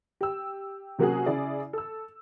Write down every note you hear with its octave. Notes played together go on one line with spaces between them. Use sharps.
G4 E6
C3 F#3 A#3 C#4 F#4 G#4
C#3 E4 G#4 D5
A4 E6